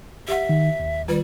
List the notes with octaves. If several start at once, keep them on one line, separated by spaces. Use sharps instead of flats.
G4 E5 F#5
D#3
D#2
D#3 G3 F4 B4